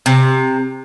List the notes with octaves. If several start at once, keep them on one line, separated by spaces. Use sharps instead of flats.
C3